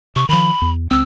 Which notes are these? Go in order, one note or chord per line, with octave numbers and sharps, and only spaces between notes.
C3 C#6
D#3 F3 B5
E2
C#2 C4 E6